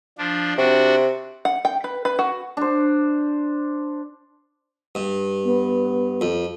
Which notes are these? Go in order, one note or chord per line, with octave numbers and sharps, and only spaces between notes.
F3 D4
C3 D4 F#4
F#5
G5
B4
B4
F#4
D4 C5
G2
B3
F2